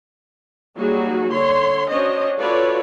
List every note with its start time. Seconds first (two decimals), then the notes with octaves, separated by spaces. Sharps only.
0.76 F#3 G3 A#3 D#4 F#4 G#4
1.31 D3 C#5 C6
1.89 C#4 D4 F#4 C5 C#5 D#5
2.38 F4 F#4 A4 B4 C#5 D5